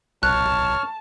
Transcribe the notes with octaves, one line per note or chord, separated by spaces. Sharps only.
B1 C#5 A5 C#6 F6 F#6